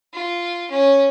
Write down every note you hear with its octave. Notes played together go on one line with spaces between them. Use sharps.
F4
C#4